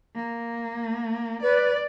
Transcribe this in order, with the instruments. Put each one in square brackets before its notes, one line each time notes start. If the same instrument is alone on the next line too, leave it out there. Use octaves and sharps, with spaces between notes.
[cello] A#3
[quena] B4 [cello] D5